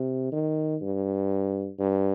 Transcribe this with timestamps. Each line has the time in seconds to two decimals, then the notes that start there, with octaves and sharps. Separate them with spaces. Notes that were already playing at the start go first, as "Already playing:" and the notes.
Already playing: C3
0.32 D#3
0.82 G2
1.79 G2